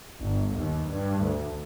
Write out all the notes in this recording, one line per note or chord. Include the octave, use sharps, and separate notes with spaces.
G1
D#2
G2
D2